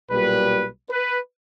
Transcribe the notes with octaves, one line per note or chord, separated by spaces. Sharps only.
B1 A#2 G3 B4
B4